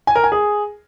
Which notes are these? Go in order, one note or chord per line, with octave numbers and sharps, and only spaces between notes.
G#5
A#4
G#5
G#4